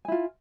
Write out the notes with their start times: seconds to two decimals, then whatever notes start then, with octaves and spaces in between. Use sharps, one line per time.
0.05 G#5
0.08 E4
0.12 F4